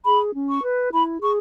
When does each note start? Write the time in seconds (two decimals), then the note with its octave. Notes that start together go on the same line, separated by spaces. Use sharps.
0.04 G#4 B5
0.34 C#4
0.48 C#6
0.63 B4
0.92 E4 B5
1.21 G#4 C#6